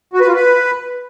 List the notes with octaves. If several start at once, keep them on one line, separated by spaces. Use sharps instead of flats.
F#4
B4
F4
B4